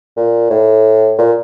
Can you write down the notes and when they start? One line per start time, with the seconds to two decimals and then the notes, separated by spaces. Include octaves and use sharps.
0.17 A#2
0.50 A2
1.18 A#2